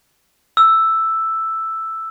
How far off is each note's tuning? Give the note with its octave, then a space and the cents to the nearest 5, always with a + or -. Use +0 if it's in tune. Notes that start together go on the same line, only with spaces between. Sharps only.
E6 +0